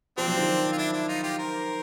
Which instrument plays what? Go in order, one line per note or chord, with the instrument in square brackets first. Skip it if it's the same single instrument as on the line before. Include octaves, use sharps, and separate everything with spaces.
[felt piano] F3 [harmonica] C4 D4
[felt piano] F#3
D#3 F3
[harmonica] F4
D4 E4
D4 E4
D#4 F4
F4 G4
A#4 C5